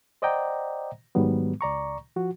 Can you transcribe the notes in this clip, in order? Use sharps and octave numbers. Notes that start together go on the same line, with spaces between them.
C5 D5 D#5 F#5 G5 A#5
G#2 D#3 F#3 G3 B3
C#2 D5 A#5 C#6
F3 F#4